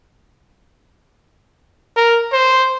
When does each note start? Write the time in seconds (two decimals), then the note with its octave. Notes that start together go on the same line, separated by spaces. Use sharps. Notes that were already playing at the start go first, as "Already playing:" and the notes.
1.96 A#4
2.32 C5